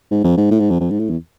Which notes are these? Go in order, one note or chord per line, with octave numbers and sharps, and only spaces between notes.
G#2
F2
G#2
A2
G#2
F2
F2
G#2
A2
E2